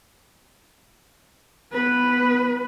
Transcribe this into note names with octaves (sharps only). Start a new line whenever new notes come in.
B3 B4